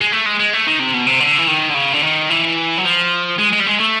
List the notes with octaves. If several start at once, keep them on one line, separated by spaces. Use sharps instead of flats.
G#3
A3
G#3
G#3
A3
D#3
C3
B2
C3
D3
E3
D#3
D3
C#3
D3
D#3
E3
F#3
F3
G#3
G#3
G3
G#3
A3